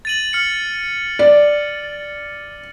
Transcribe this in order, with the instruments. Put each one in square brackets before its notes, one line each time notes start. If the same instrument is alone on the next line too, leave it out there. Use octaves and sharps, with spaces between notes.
[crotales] A6 D#7 F#7
F6 C#7
[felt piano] D5